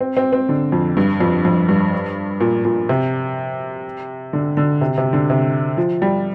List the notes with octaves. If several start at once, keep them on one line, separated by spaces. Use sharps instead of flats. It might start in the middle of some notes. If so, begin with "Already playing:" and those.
C4
C4
C4
D3
F2
G2
F2
F2
G2
A#2
A#2
C3
D3
D3
C3
C3
D3
C3
F3
G3